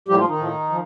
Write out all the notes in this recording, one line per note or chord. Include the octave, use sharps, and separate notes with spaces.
A2 F3 G3 G4
F3 F4
D#3 D#4
A2 F3
F3